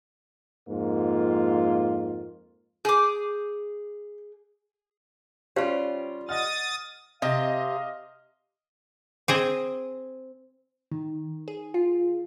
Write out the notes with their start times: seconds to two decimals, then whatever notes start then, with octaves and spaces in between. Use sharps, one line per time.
0.69 F2 G#2 A#3 F4
2.85 G#4 D6 G6
5.56 G3 C#4 F4 G4 C5 F5
6.29 D#5 F#5 D#6 F6 A6
7.22 C3 D#5 F5
9.28 C4 G#4 D#5
10.92 D#3
11.48 G#4
11.74 F4